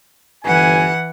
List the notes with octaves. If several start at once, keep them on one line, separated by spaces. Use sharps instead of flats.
G1 E3 F#5 G#5